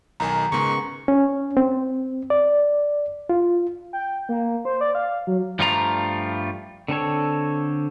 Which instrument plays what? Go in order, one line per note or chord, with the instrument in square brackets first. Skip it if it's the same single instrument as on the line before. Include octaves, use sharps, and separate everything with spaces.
[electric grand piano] B1 D#3 G#5 [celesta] A#5
[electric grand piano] G#2 G#3 [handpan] C#3 B3 A#4 [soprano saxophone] C#6
[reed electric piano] C#4
C4
D5
F4
[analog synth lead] G5
A#3
C5
D5
F5
F#3
[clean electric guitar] G2 F3 G3 A3 F4 A#5
[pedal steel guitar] D3 C4 A4 C#5